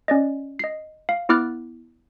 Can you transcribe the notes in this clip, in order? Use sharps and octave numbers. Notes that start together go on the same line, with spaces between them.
C#4 D5 D#5
D#5 C7
F5
B3 E4 D6 F6 F#6 A6